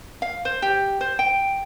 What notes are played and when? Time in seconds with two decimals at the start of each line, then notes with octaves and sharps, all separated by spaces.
0.22 F5
0.45 C5
0.62 G4
1.01 C5
1.19 G5